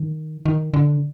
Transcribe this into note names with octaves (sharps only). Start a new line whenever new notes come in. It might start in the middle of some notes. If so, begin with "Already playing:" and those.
Already playing: D#3
D#3
D3